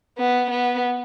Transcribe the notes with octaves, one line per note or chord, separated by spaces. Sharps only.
B3
B3